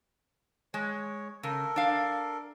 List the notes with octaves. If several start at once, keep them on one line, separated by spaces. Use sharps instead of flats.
G#3 C#5
C#3 A4 A#4
D4 F5